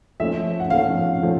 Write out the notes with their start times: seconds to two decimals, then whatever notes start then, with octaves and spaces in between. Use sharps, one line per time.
0.20 F3 A3 C#4 E5
0.60 F#5
0.70 F3 A3 C#4 F5
1.22 F3 A3 C#4